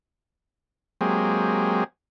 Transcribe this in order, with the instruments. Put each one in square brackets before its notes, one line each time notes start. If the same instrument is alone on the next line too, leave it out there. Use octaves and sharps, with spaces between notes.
[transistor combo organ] F#3 G#3 A#3 C4 G4 G#4